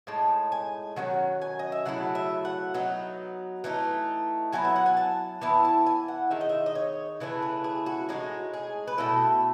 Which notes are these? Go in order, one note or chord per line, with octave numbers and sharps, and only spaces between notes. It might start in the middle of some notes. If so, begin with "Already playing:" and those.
A2 G#3 D#4 A5
G#5
D#3 F#3 C#4 F#5
G#5
D#5
E5
C#3 F#3 A3 E4 F#5
E5
F#5
F#3 B3 D#4
E3 A3 D#4
F#3 B3 E4 G#5
E5
F#5
G#5
A5
E3 B3 E4 A5
A5
G#5
F#5
D#3 G#3 D#4 E5
D#5
E5
D#5
C#5
C#3 E3 A3 E4 B4
B4
G#4
F#4
A2 G#3 D#4 F#4
G#4
B4
B2 A3 E4 A4